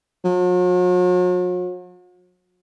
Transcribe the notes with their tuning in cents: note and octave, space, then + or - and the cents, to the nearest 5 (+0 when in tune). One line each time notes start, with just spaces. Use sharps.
F#3 -45